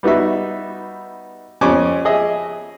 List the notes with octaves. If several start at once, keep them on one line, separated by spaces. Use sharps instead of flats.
G3 B3 D#4 F#4 E5
F2 C#4 G#5 C#6 D6
G#4 D#5 E5